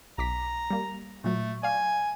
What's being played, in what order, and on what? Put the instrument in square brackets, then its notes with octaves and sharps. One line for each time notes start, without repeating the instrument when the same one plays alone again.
[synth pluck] B1 D6 B6 [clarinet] A#5
[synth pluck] G3 A#3
[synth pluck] A#2 F#3 [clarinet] A3
[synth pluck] D5 F5 [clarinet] G#5